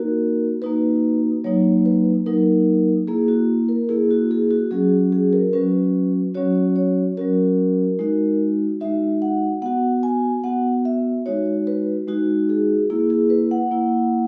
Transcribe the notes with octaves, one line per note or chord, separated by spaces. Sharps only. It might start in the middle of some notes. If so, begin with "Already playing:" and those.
Already playing: A#3 D#4 F#4 A#4
A#3 D#4 F#4 B4
F#3 A#3 D#4 C#5
B4
F#3 A#3 D#4 A#4
A#3 E4 G#4
F#4
A#4
A#3 E4 G#4
F#4
G#4
F#4
F#3 C#4 F#4 G#4
G#4
A#4
F#3 C#4 F#4 B4
F#3 C#4 F#4 C#5
C#5
F#3 C#4 F#4 A#4
G#3 D#4 F#4
G#3 D#4 F#4 E5
F#5
B3 F#4 F#5
G#5
B3 F#4 F#5
E5
G#3 D#4 F#4 C#5
B4
G#3 D#4 F#4
G#4
A#3 E4 G#4
G#4
B4
F#5
A#3 E4